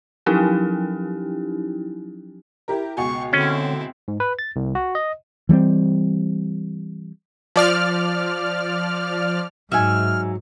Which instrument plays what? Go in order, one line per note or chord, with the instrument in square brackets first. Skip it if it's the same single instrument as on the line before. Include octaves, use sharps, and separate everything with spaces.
[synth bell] F3 F#3 C#4 D#4 E4 G4
[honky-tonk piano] E4 G4 A#4
[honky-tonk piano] C#2 B2 G#5 [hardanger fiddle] C#6
[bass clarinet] D3 [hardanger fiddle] C4 E4 [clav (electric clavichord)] C#4
[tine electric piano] G#2
B4
A6
C2
F#4
D#5
[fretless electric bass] E3 G3 A3 C4
[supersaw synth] F3 D5 F6
[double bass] G#2 [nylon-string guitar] F#3 D#4 [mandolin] E5 G#5 [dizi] F6